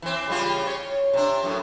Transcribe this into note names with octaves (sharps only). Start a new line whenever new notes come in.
E3 C4
C#3 G3 F4
C#5
C3 D4
F#2 A2